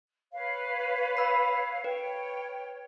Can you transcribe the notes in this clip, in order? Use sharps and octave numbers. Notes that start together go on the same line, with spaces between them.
B4 C#5 F5
B5 E6
B4 C#5 G5